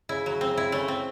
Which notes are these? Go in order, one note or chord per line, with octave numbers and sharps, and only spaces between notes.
C#3 E4
F#3
C4
E4
C#3 A3
C4